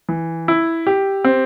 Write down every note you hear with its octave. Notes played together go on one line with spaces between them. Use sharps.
E3
E4
G4
C4